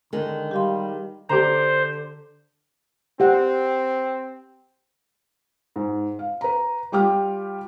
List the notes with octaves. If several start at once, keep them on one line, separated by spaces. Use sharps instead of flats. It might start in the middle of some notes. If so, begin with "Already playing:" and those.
D3 D#3 G#3
G3 G4 F5 C6
D3 G4 C5 A#5
C4 G4 F#5
G#2
F5
B4 A#5
G3 F4 G4 G5 D6 F6